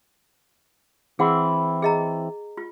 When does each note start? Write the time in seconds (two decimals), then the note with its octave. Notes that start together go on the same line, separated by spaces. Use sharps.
1.19 E3 C4 E4 G#4 F#5
1.82 G#4 D#5 A#5
2.57 F4